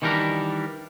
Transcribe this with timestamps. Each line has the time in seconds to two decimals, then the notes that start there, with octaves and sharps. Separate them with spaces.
0.02 D#3 E3 G3 D4 A#4